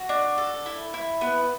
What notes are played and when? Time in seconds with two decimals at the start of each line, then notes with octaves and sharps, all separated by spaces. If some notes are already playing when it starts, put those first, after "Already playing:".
Already playing: F#4
0.09 D4
0.38 A4
0.66 E4
0.94 E4
1.21 B3 B4